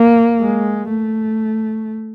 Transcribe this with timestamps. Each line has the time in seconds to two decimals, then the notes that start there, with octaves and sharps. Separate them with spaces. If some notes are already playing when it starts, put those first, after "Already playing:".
Already playing: A#3
0.40 G#3
0.89 A3